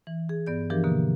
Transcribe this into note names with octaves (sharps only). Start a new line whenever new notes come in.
E3
G#4
G2 B3 D5 G6
E3 F3 D4 G4 A#4
B2 D3 A#3